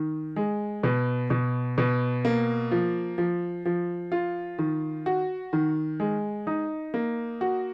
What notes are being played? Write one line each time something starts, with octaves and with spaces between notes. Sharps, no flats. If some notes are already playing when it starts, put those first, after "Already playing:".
Already playing: D#3
G#3
B2
B2
B2
A#3
F3
F3
F3
F4
D#3
F#4
D#3
G#3
D#4
A#3
F#4